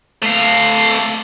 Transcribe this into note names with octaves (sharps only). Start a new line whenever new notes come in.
A3 F5